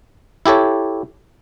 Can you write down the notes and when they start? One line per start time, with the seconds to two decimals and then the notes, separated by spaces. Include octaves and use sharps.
0.46 E4 G4 A4 C#5